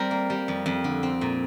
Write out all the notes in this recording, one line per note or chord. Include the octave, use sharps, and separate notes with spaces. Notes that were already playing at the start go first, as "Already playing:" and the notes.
Already playing: G3 C4 A#4
A#3
G3
F2
F2
D3
C4
A#2